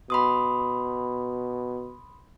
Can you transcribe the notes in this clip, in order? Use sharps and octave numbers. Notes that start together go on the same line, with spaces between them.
B2 B5 C6 D#6